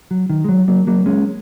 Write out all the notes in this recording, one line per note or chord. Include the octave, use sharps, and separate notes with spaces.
F#3
D#3
G#3
F#3
F#3 A#3
F#3 A#3
G#3 C#4